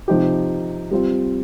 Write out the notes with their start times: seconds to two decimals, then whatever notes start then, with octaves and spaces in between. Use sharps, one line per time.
0.08 C3 F3 D#4 G4
0.91 G3 C4 F4